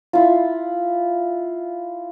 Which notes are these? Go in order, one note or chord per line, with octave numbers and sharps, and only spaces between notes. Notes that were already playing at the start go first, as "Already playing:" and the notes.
E4 F4